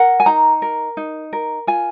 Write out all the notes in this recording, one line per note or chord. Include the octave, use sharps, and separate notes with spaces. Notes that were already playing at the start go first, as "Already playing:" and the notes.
Already playing: A#4 F#5
G#5
D#4 A#5
A#4
D#4
A#4
F4 G#5